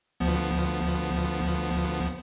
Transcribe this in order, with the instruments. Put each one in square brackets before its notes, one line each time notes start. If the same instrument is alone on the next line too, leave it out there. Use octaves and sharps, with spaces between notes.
[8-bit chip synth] D2 F3 B3